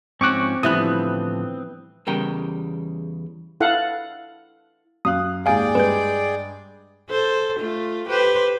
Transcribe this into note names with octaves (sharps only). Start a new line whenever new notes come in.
G#2 F3 C4 C#4 C#6 D6 F#6
A2 D3 E3 F3 G3 B3 D#6 F#6
E2 C#3 G3 A#4 G5
E4 A4 F5 F#5
F#2 F5 D#6 F#6
D#2 G#2 G#4 D5 F5 G5 G#5
G2 G#3 B4 G6
A4 C5
A3 F4
G4 B4 C5